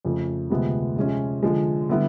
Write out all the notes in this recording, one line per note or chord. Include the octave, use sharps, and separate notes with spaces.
F2 C#3 F3 A3
D2 C3 F3 G#3 B3
C3 F3 G#3 C#4 F4
D3 F3 G#3
D3 G3 B3 E4